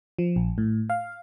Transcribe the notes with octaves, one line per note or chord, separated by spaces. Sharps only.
F3
A#1
A2
F5